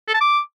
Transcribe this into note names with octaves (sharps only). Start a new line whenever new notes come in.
A4
A5
D6